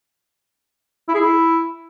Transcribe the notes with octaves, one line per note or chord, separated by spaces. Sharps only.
E4
G#4
E4